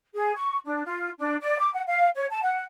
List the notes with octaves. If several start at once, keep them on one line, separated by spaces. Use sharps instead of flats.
G#4
C#6
D4
F4
D4
D5
D6
F#5
F5
C#5
A5
F#5